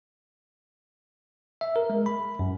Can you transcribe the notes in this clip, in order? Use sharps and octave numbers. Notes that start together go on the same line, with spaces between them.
E5
A#4
G#3
B5
F#2